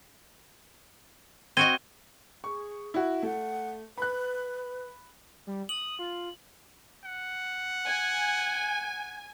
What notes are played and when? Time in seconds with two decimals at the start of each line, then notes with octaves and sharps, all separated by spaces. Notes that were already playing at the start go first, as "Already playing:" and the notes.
1.57 C4 F#4 D#5 G#6 D#7 G7
2.44 G#4 C#6
2.94 E4 F#4
3.23 A3 F#5
3.98 B4 B5 F#6
5.47 G3
5.69 D#6 F#7
5.99 F4
7.04 F#5
7.88 G#5